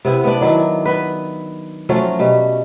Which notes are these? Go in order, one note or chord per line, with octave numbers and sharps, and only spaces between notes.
C3 B3 E4
B3 D4
D#3 F#3 D4 E4
B3 B4
F3 F#3 A3 C#4
B2 G3